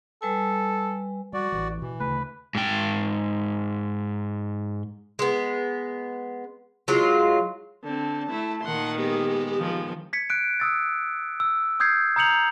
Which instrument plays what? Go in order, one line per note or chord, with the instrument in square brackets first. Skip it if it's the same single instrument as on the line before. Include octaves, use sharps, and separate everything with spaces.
[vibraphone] G3 B4 G#5 [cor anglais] A4
[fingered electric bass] G3 [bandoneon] F#4 D5
[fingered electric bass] A1 E3
[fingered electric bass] B2 [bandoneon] E3
[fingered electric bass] D2 C#3 A3 [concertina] B4
[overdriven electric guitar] G#2 G5
[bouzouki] G#3 B3
F#3 G#3 F4
[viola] D3 C4 [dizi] A5
[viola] A3 E4
[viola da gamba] A#2 D#3 [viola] F#5 C6
[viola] G#3 B3 [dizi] G4
[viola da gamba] D#3 F3
[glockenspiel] G#6 B6 C#7
F#6 D7
D#6 E6 A6
E6
D#6 E6 G6 G#6 C7
A#5 D#6 G6 C#7 F7 F#7